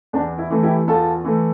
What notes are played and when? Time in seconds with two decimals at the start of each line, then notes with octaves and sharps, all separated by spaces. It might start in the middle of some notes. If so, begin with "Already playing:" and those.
0.13 E2 D4
0.38 E4
0.50 E3 A3
0.63 E4 G4
0.88 E2 F4 A4
1.24 E3 A3